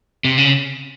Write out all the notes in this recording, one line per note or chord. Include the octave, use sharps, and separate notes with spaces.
C3
C#3